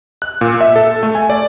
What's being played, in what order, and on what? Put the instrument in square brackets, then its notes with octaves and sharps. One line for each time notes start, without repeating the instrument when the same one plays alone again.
[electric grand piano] F#6
A#2
E5
A4
A3
G#5
D5